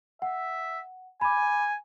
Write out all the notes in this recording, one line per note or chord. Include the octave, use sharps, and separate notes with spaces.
E5 F#5
G#5 B5 D6